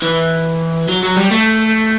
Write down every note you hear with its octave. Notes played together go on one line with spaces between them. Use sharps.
E3
F#3
F#3
G3
A3